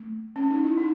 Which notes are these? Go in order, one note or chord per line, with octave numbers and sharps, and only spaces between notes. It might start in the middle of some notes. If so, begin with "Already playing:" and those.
Already playing: A3
C#4
D#4
E4
D#4